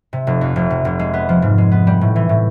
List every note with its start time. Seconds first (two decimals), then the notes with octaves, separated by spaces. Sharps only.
0.13 C3
0.27 F1
0.41 F2
0.56 F1
0.70 C3
0.85 F1
0.99 G#3
1.14 B3
1.29 F3
1.42 G#2
1.58 G#3
1.72 B3
1.87 G3
2.01 A2
2.16 E3
2.29 A2